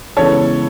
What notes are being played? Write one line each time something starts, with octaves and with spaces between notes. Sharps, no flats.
C#3 E3 G#3 B3 A4 C#5